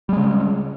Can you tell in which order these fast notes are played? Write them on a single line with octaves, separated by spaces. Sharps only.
G3 G#3 C#3